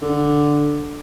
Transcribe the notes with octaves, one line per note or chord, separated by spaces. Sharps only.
D3